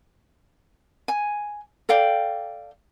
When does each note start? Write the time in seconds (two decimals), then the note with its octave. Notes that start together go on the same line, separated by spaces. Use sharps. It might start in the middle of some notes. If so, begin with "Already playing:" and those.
1.08 G#5
1.89 A4 D5 F5 G5